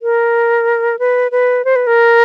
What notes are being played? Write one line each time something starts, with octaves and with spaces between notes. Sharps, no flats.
A#4
B4
B4
C5
B4
A#4